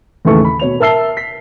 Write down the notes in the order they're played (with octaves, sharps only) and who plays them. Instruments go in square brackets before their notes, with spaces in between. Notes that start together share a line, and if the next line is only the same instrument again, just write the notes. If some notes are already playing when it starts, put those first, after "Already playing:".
[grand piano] D#2 A2 C#3 E3 A4 C#6
B5
B2 C#5 F7
A#4 E5 A5 E6 C7 G7
B6